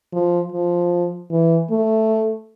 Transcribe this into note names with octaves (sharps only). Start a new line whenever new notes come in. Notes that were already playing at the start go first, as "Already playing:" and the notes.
F3
F3
E3
A3